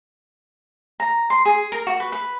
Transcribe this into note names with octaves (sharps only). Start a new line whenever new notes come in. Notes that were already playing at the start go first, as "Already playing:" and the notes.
A#5
C6
G#4
A#4
F#4
B4
B4